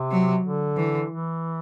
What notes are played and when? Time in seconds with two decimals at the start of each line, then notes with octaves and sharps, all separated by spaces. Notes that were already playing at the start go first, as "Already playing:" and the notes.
Already playing: C3
0.11 F#3
0.43 D3
0.77 E3
1.10 E3